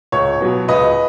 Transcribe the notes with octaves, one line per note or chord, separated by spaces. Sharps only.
C#2 C#5
B2 F#3 B3
C#2 B4 D#5